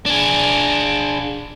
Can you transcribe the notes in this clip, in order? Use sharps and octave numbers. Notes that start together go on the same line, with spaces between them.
D4 G#4